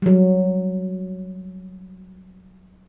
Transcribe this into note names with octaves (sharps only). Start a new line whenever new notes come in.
F#3 G3